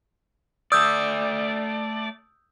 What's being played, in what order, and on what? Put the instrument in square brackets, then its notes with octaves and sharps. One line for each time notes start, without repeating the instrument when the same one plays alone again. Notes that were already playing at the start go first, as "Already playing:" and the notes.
[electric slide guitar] A3 D5 [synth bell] D#6 E6 G6